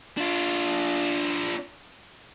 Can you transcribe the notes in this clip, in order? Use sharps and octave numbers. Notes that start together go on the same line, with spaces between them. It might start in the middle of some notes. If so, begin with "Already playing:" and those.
D4 F4